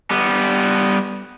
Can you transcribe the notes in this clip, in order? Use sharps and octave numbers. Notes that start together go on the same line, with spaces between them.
G3 B3